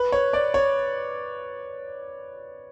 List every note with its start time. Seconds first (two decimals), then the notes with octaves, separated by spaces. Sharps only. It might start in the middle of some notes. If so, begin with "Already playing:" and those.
Already playing: B4
0.12 C#5
0.33 D5
0.54 C#5